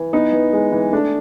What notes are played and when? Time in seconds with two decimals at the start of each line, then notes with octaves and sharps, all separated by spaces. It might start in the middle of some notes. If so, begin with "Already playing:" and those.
Already playing: E3
0.13 B3 D#4
0.32 E3
0.53 G#3
0.72 E3
0.92 A3 D4